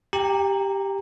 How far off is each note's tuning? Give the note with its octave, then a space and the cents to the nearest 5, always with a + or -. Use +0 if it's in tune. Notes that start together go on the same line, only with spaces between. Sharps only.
G4 +0 G5 +45 A#5 -10